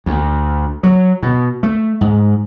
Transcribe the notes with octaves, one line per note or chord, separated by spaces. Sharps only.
D2
F#3
B2
A3
G#2